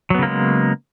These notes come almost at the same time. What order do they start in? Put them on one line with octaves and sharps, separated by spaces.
F#3 B3 C#3 A#3 G#3